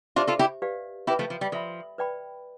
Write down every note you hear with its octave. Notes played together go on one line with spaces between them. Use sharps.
D4 F4 G4 C5 E5
F4 A4
E4 G4
G4 B4 D5 F5
E4 G4 B4 E5 B5
F3 A3
F3
G3
F3 A4 E5 B5
B4 D5 G5 B5